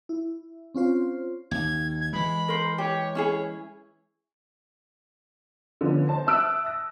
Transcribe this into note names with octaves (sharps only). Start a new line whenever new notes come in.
E4
C4 C#4 F4 C5
D#2 G#6
G#6
E3 G#3 B5
A#4 C5
G4 C#5
C#4 E4 G#4
D3 F3 B3 C#4 D4
C5 A5 A#6
E5 A5 D#6 E6 F#6 D7
A#6